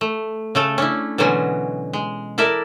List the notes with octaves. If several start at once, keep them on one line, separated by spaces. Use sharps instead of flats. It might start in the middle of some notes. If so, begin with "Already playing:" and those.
A3
C#3 A3 A4
C#4 D4 E4
B2 D3 E3 F#3 G#3 C#4
G#3
E4 A4 A#4 D5 E5